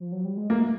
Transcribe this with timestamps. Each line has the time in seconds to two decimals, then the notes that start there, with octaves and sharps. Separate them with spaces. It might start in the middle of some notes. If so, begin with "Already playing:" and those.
0.00 F3
0.12 F#3
0.25 G3
0.37 G#3
0.50 A3 A#3